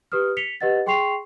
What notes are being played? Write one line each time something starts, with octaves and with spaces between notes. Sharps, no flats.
G4 B4 D#6 F6
B6 C#7 F7 G7
G4 B4 D#5 F#5 A6
G#4 G5 C6 C#6 C7 F7